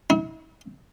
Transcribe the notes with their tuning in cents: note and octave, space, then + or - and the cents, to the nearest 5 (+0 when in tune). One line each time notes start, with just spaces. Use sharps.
E4 -45